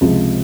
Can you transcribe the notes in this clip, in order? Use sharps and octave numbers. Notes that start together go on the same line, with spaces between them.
C#2 C3 F3 G#3